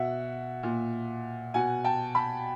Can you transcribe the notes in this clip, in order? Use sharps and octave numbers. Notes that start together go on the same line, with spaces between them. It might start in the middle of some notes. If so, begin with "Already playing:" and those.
Already playing: B2 E5 F#5
A#2
B2 F#5 G#5
G5 A5
A5 B5